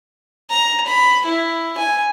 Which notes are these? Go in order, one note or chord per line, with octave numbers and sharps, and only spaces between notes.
A#5
B5
E4
G#5